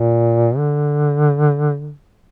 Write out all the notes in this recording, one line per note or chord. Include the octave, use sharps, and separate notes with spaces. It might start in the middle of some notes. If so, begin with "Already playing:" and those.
Already playing: A#2
D3